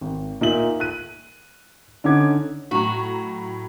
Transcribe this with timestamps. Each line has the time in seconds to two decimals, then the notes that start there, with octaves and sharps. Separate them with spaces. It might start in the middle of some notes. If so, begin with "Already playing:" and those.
0.01 G#1
0.41 A#2 D#4 E5 F#7
0.80 F#6 D#7
2.04 D3 C#4 D#4 F#5 D6 G#6
2.71 A2 F#3 F#4 A#5